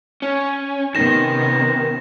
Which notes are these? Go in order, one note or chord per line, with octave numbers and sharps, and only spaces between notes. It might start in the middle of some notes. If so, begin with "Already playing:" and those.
C#4
C3 D#3 B3 C#4 A#6 E7